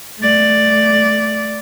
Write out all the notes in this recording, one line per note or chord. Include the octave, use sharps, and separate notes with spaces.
A3 D5